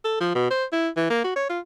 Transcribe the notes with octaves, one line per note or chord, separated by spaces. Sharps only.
A4
F3
B2
C5
E4
E3
A#3
F#4
C#5
F4